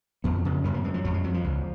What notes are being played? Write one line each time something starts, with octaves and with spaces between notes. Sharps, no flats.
F2 B3
C#3
F#2 B3
A#3
F#2 G#3
F3
F2 F#3
G#3
F2 F#3
F3
C#2